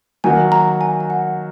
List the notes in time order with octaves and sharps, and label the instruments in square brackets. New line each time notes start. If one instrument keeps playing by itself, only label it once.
[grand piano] D#3 F#3 A#3 F#4 [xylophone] G#5
[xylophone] A#5
G#5
G#5
F#5